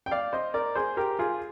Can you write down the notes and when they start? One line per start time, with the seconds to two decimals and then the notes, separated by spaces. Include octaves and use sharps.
0.06 G5
0.11 D5 F5
0.33 C5 D#5
0.54 A#4 D5
0.75 G#4 C5
0.97 G4 A#4
1.19 F4 G#4